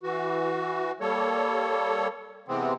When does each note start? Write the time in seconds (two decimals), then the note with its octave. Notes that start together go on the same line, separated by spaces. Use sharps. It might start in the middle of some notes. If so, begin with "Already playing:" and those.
0.03 E3 F#4
1.01 G3 A#3 A4 C#5
2.48 C3 E3 G#3 B3 C4